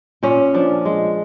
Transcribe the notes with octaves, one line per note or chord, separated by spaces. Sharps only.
A#2 C#4
F3 D4
G#3